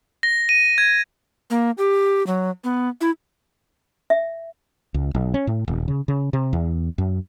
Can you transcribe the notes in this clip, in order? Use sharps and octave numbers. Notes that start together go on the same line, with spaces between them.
A#6
D#7
G#6
A#3
G4
F#3
B3
E4
E5
C#2
B1
C#4
A2
D#1
C#3
C#3
C3
E2
F#2